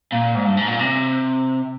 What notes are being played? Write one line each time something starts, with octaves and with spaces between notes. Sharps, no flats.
A#2
G#2
G2
G#2
A#2
C3